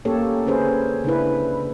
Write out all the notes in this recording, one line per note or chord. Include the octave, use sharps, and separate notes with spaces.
A#3 C#4 G4 A4 C#5
D3 C#4 G#4 B4 C5
C#3 D4 E4 B4